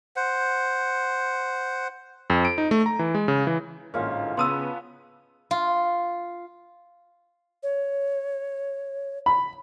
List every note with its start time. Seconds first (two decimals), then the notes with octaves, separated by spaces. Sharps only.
0.16 C5 F#5
2.30 F2
2.45 D7
2.58 D#4
2.71 A3
2.86 A#5
2.99 E3
3.15 G#3
3.28 C#3
3.47 E3
3.94 A1 G#2 D3 A#3 C#4 F4
4.37 C#3 B3 A5 C6 D#6 E6 D#7
5.51 F4
7.63 C#5
9.26 B5